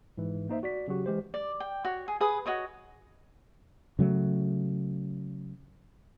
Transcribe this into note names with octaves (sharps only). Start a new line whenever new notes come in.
G#2 E3
A#3 D#4 C5 E5
F#4 D5 B6
C#3 F#3 F#4 G4
E3 G#3 G4 C5
D5
G5
F#4 C#5
G#4
G#4 B4 D#6
F#4 C#5 D#5 C#6
C#3 F#3 A3